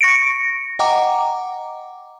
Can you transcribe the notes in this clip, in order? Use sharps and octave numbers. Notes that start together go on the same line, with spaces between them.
C#6 A#6 C#7 D7
D#5 F#5 G5 A#5 D6